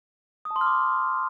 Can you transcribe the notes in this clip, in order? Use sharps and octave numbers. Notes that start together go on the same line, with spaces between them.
D#6
A5
C6
F6
D6